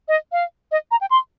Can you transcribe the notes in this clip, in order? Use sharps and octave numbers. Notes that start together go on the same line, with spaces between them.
D#5
F5
D#5
A#5
G5
C6